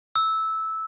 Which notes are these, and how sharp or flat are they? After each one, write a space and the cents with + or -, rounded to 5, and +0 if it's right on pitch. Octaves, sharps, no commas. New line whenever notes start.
E6 -15